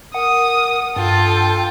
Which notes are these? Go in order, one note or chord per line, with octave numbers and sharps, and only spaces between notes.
A#4 F#5 D#6
G2 F4 A4 G5